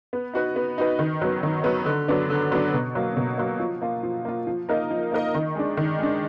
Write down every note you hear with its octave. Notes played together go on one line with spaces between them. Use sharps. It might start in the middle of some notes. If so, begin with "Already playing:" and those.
B3
D#4 F#4 B4
B3
D#4 F#4 B4
D#3
F#3 B3
D#3
F#3 B3
D3
F#3 B3 D4
D3
F#3 B3 D4
B2
F#3 A#3
B2
F#3 A#3
F3
A#3 F4
F3
A#3 F4
F3
A#3 D#4 A#4 D#5
F3
A#3 D#4 A#4 D#5
D#3
G#3 D4
D#3
G#3 D4